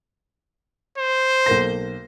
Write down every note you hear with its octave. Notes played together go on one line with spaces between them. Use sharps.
C5
B1 A#3 A#6